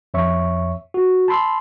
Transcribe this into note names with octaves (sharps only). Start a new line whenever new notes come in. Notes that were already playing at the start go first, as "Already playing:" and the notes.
F2 C#5 E5 C#6
F#4
A5 B5 C6 E6